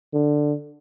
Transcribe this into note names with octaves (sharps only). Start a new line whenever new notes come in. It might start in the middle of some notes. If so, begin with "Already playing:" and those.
D3